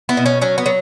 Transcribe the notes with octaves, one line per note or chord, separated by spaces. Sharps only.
B3 E4
B2
C#4
F#3 C#4
B3
F#3